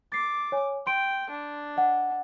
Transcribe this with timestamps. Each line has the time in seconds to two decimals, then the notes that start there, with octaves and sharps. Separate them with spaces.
0.12 D6 A6 C7
0.52 C#5 G#5
0.87 G5 C6 D7
1.30 D4
1.77 D#5 F#5